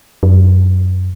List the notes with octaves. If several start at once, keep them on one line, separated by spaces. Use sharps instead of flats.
F#2